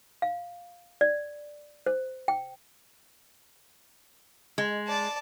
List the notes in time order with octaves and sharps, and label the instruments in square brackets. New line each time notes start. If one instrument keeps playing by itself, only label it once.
[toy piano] F5
D5
C5
G5
[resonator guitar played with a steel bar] G#3
[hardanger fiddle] D5 A5